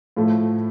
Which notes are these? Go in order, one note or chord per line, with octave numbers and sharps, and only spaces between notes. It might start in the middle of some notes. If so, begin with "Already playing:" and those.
A2 F3 A3